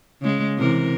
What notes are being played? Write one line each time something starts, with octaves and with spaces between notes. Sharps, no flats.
C#3 G#3
C3 E3 A#4